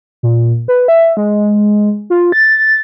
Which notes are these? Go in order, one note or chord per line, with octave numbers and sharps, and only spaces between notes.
A#2
B4
E5
G#3
F4
A6